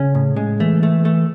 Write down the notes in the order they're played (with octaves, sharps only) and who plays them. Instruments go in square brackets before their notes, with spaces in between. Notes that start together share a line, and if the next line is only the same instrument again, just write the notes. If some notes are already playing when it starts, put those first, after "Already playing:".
Already playing: [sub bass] C#3 [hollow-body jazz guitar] C#4
[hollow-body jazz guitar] A2
G#3
[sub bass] E3 [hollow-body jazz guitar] A3
[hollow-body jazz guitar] A3
A3